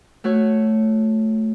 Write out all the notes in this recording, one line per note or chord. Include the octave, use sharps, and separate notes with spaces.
A3 F#4 C#5